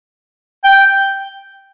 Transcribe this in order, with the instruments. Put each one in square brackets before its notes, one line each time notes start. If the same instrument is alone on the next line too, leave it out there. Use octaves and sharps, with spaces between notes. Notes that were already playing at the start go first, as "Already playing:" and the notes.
[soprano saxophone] G5